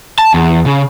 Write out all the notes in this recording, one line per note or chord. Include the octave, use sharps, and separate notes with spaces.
A5
E2
C#3